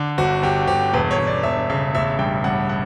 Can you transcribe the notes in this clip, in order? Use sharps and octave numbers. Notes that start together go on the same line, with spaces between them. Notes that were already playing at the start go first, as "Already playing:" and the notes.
Already playing: D3
G1 F#4
G1 G4
G1 G4
E1 B4
C#5
E1
D5
E1 E5
C#3 E5
A1 E5
G2 G5
G2 F#5
F#5